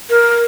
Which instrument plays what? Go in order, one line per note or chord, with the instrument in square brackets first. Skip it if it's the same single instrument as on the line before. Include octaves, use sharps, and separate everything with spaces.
[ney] A#4